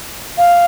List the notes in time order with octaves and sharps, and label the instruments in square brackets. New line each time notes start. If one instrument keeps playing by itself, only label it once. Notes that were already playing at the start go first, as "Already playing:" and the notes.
[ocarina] F5